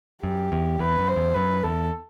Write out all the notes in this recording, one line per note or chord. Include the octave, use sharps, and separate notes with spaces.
F#2 G4
E2
E2 B4
F#2
C5
E2
F#2 B4
E2 A4